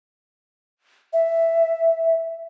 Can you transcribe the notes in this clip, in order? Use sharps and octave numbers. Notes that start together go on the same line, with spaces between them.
E5